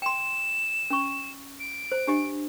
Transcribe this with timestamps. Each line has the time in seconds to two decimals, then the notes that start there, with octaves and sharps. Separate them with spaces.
0.02 G5 C6 E7
0.90 C#4 C#6
1.60 D7
1.92 C5
2.07 D4 G4 D#5